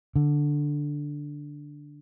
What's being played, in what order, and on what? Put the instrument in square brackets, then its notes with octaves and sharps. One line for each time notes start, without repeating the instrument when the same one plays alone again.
[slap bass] D3